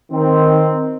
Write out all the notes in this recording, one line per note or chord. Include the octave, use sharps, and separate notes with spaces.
D#3 C4